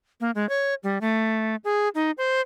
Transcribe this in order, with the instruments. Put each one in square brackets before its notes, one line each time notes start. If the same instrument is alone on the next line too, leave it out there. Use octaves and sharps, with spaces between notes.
[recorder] A#3
G#3
C#5
G3
A3
G#4
D#4
C5